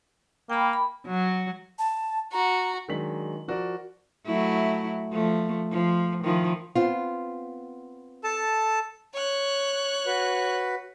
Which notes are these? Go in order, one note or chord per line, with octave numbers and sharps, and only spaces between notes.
A#3 G5 B5
B5
F#3
A5
F#4 A#5
D#3 F#3 G#3 D4 B6 F#7
F3 F#4 A#4 D5
F#3 A3 E4
F3 A3
F3
D#3 F3 E4
B3 C4 F4
A4 A5
C#5 F#6
F#4 B4